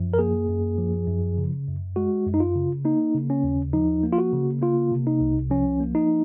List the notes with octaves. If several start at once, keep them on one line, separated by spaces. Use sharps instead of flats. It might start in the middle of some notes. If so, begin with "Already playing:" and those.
Already playing: F#2 F3
A#4
A#3 G#4
F#2
F3
F#2
C#3
F#2
G#3 F#4
F#2
D#4
F4
C#3
A#3 D#4
C#3
C#4
D#2
F3 D#4
A#3
F4
F#4
C#3
A#3 F4
C3
D#4
C2
F3 C#4
A#3
D#4